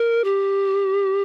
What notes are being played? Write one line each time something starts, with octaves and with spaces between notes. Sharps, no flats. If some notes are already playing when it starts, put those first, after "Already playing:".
Already playing: A#4
G4